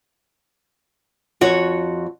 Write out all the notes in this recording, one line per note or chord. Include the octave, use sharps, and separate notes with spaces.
F2 F#4 C#5